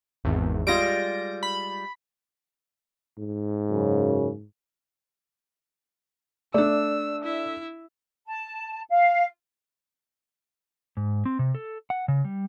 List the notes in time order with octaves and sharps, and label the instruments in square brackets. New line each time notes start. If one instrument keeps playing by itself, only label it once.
[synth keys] G#1 E2
[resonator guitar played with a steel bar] G3 G#3 F4 [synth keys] A#6 D7
[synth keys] B5
[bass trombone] G#2
[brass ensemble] F#2 C#3
[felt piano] A3 D4 [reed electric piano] D5 [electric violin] E6
[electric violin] E4 E5
[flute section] A5
F5
[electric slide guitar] G#2
C4
C3
A4
F#5
C#3
G3